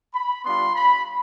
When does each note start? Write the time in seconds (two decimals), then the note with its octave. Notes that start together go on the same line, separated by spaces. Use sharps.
0.14 B5
0.45 G3 B3 D4 F4 C6
0.75 B5